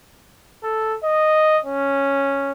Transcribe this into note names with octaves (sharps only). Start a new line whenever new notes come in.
A4
D#5
C#4